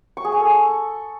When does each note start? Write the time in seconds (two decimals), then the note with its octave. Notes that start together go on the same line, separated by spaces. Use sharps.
0.17 C#6
0.25 G#4
0.32 G#5
0.40 A4
0.47 C#6